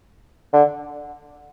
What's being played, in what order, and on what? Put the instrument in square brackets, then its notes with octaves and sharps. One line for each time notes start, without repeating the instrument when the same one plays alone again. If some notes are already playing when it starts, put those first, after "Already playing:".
[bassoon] D3